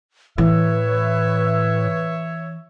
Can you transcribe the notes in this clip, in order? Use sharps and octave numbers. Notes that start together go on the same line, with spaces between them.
A2 E3 B4 C#5 E5